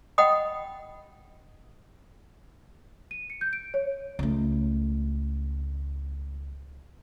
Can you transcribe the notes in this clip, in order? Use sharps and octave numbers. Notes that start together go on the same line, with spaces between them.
D#5 F#5 G5 B5 D#6
D#7
C#7
G6
D7
C#5
C#2 A3